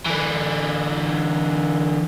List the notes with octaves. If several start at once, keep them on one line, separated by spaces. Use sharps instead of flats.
D3 E3